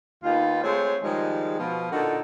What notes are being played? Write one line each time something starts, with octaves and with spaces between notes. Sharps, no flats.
D#2 B3 D#4 F4
G#3 A3 C4 C5 C#5
D#3 F3 G3 G#3
B2 F3 B3
A#2 D3 D#4 F#4 A4 A#4